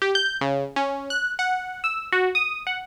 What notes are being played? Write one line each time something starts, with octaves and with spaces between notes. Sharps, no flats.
G4
G6
C#3
C#4
F#6
F#5
E6
F#4
D#6
F#5